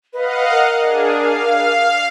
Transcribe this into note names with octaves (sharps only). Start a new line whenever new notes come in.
B4 D#5 F5 F#5
A#4
D4 G#4
F5